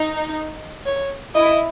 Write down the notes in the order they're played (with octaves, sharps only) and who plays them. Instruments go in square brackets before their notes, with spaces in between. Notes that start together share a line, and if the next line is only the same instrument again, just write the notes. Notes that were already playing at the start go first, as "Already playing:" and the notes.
Already playing: [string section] D#4
[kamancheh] C#5
[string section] E4 [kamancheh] D#5